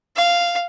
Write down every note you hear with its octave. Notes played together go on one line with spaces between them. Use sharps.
F5